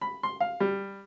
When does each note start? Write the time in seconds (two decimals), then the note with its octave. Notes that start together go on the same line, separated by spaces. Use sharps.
0.01 B5
0.23 C6
0.40 F5
0.60 G3